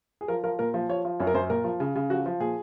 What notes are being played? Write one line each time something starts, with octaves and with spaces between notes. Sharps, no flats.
G#4
F3 A#4
F3 A#4
A#2 A#4
F3
F3 C#5
F3
F#2 C#5
A#4
F#2 C5
A#2 A#4
F3
C#3
C#3
F3 F#4
F3
A#2 G#4